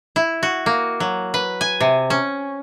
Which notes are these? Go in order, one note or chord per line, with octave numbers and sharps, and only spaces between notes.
E4
F#4
A#3
F#3
B4
G#5
C3
C#4